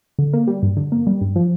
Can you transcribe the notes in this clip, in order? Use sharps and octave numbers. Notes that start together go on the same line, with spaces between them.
D3
A#3
G3
G2
D3
A#3
G3
G2
F3